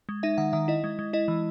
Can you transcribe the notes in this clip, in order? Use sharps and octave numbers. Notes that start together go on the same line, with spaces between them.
G#3
D#4 E5
D#3 F#5
D#3 E5
E4 D#5
G#3
G#3
E4 D#5
E3